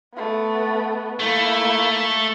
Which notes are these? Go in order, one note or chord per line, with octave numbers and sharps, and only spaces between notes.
A3 B3
A3 A#3 E4